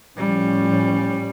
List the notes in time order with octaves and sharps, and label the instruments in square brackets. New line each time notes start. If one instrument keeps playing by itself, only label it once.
[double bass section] A2 F3 C#4 [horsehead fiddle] G3